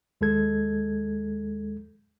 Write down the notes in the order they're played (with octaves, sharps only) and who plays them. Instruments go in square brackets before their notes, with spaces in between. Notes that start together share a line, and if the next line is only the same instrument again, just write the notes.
[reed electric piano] D#2 G#3 A4 G#6